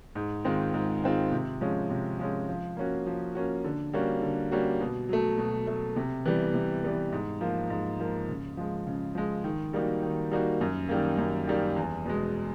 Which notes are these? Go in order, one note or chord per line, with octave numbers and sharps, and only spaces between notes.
G#2
D#3 G#3 C4 F4
G#2
D#3 G#3 C4 F4
C3
F3 G#3 C#4
C3
F3 G#3 C#4
F3
A#3 C#4 F#4
F3
A#3 C#4 F#4
D3
G3 A#3 C#4 F#4
D3
G3 A#3 C#4 F#4
B2
F#3 A3
B2
F#3 A3
C3
E3 G3 B3
C3
E3 G3 B3
G#2
F3 A#3
G#2
F3 A#3
C#3
F3 G#3
C#3
F3 G#3
D#3
G3 A#3 D#4 F#4
D#3
G3 A#3 D#4 F#4
F#2
D#3 G3 A#3
F#2
D#3 G3 A#3
E2
B2 G#3